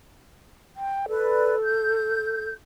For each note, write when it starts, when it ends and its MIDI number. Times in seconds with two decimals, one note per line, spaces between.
0.76 1.06 79
1.09 2.47 69
1.09 1.55 71
1.09 1.55 74
1.64 2.53 91